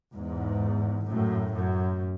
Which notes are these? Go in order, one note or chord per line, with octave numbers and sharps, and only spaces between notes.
E2 G#2
F#2 A2
F#2